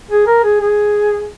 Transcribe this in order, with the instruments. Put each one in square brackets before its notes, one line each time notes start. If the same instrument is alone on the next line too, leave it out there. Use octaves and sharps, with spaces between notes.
[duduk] G#4
A#4
G#4
G#4